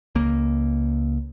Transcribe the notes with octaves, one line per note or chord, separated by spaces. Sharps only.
C#2 A#3